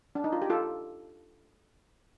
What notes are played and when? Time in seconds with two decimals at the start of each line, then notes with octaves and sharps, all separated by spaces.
0.15 D4
0.24 D#4
0.33 F4
0.42 G4
0.50 F4 A4